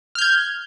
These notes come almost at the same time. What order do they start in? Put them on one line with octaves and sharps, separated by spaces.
F6 G6 G#6